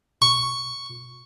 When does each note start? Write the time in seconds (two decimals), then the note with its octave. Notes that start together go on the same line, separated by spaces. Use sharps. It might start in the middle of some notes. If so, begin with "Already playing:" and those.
0.22 C#6